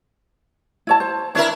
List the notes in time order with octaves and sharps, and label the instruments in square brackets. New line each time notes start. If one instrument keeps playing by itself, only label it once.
[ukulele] E4 C#5 A5
C5
[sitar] D4 E4 A#4 [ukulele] C#5 E5